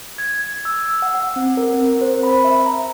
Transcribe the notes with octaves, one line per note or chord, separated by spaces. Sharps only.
G#6
E6
F#5
F#5
C4
A#4
C4
C5
B5
E5
A#5